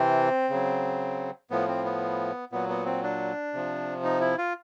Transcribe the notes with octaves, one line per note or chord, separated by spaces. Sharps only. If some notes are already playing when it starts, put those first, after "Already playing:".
Already playing: C3 E3 C4
C#3 F#3
A2 F3 B3
C4
B3
A#2 F#3 B3
B3
C4
D4
C3 F3
D#4
E4
F4